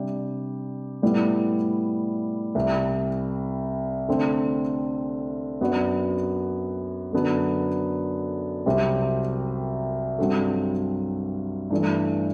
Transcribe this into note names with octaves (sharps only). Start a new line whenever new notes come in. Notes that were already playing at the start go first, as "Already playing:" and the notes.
Already playing: C3 G3 D4 G4
A2 G3 B3 E4
C2 C3 G3
D3 A3 C4
F#2 F#3 B3 D4 F#4
F#2 D3 F#3 B3
C2 C3 F#3 C4 G4
G2 F#3 C4 F#4 A4
G2 E3 A3 D4